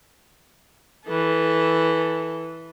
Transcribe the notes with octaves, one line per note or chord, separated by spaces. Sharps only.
E3 A4